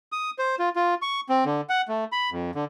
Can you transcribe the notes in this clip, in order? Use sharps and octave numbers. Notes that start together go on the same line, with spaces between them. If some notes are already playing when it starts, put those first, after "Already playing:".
D#6
C5
F4
F4
C#6
C4
D3
F#5
A3
B5
F2
D3